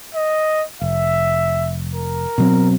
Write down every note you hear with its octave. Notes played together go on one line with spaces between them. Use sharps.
D#5
F1 E5
A#4
B2 F#3 C4